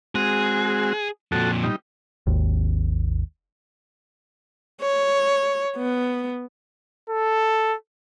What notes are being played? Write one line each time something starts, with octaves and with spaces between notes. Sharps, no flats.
G#3 C4 F#4 G#4
F2 A#2 F#4 A4
G3 D#4
G#1 D#2
C#5
B3
A4